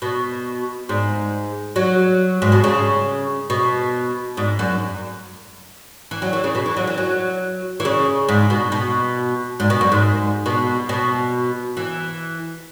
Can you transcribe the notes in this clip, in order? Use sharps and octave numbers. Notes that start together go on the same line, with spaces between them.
B2
G#2
F#3
G#2
B2
C#3
B2
G#2
F#2
E3
F#3
E3
C#3
B2
E3
F#3
E3
F#3
E3
C#3
G#2
B2
B2
G#2
B2
F#2
G#2
B2
B2
E3